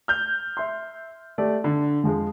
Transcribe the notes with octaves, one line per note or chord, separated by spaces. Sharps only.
F6 G6 F7
E5 C6
A3 G4 D5
D3
F2 F3 G#3